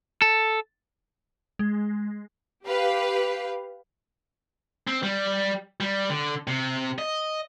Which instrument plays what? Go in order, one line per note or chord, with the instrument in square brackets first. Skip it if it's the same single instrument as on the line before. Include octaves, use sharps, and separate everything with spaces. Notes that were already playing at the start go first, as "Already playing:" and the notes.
[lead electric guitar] A4
[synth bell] G#3
[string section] G4 B4 F5
[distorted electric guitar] C4
G3
G3
D3
C3
D#5